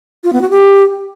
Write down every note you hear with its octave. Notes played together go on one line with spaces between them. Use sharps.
F4
B3
F#4
G4